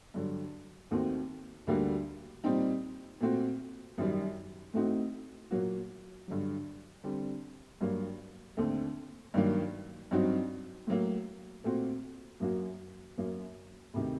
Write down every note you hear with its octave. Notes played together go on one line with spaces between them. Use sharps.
G2 D3 F#3
D#2 D#3 A3 C4 F#4
D2 D3 G3 A#3 F#4
A#2 G3 C4 D#4
A#2 A3 C4 F#4
F#2 D#3 G3
A2 A3 C4 D#4 F#4
A#2 F#3 A#3 F#4
G2 D3 F#3
D3 G3 C4
G2 F#3 A#3
D#2 D3 A3 C4
G2 D#3 F#3 A#3
G2 F#3 C4 D#4 F#4
A2 F#3 A#3
A#2 A3 C4 F#4
F#2 F#3 A#3 F#4
F#2 F#3 A#3
D2 C3 D#3